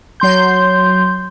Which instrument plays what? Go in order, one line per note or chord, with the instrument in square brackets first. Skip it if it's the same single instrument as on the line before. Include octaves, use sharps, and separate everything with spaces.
[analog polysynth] F#3 C6 G6